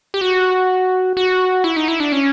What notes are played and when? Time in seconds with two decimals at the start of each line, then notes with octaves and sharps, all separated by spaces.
0.14 G4
0.21 F#4
1.17 F#4
1.64 E4
1.76 D#4
1.88 E4
2.00 D4
2.12 C#4